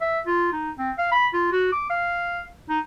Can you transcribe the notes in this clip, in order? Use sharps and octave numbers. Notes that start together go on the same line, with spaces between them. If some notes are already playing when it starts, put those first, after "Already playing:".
E5
F4
D#4
C4
F5
B5
F4
F#4
D6
F5
D#4